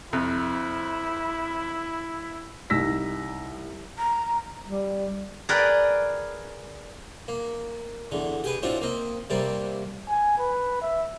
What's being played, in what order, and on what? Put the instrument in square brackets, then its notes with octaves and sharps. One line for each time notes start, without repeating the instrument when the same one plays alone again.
[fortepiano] F2 C3 [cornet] E4
[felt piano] C2 D#4 E6 A#6 B6
[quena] A#5
[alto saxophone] G3
[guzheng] G#4 A#4 B4 D5 G5
[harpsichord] A#3
E2 D3
G4 G#4 B4
A2 C4 D4 F4 F#4
A#3 C4 D#5
C3 G3 A#3 C4 D5
[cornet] G#5
B4
E5